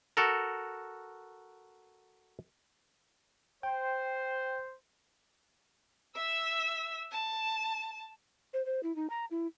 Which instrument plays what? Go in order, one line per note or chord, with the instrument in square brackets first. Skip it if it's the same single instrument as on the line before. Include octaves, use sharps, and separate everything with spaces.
[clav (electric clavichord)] F#4 A4 A#4
[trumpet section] C5 [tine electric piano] G5
[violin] E5 E6
A5
[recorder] C5
C5
E4
D#4
A#5
E4